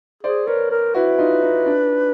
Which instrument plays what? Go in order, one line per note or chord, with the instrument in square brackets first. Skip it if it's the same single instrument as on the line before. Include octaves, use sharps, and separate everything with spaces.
[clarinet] G#4 [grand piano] C5 D5
[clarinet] A#4 [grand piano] B4 C#5
[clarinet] A#4
[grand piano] E4 F#4 [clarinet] B4
[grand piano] D#4 F4
D#4
D4